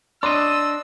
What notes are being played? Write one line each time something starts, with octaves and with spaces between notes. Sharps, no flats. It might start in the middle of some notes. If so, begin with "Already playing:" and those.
D4 D5 D#5 C6 E6